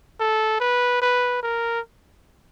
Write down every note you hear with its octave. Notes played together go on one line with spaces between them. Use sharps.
A4
B4
B4
A#4